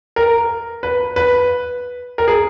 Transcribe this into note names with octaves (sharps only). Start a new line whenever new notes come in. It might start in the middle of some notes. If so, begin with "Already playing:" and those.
A#4
B4
B4
A#4
G#4